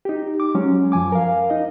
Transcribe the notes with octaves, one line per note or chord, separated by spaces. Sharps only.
D#4 G4
D6
F#3 G#3 C#4
F#2 F3 G#5 D6
A#4 F5
D#4 D#5